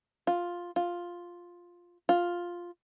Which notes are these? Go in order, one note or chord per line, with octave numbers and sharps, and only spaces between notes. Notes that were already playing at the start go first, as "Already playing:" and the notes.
F4
F4
F4